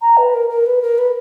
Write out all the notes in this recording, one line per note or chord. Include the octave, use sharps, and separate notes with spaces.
A#5
B4
A#4
A#4
B4
A#4
B4